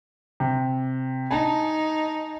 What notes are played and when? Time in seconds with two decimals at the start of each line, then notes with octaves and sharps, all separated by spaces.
0.40 C3
1.31 D#4 G#5 A5